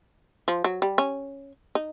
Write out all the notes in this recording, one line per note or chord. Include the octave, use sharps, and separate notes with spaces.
F3
F#3
G3
C#4
D#4